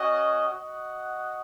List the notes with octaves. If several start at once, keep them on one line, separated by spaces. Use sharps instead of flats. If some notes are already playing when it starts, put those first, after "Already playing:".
Already playing: C#4 F#4 D#5
F#4 D#5 F#5